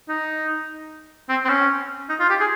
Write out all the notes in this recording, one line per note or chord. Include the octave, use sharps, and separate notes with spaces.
D#4
C4
C4
C#4
D#4
F4
G4
G#4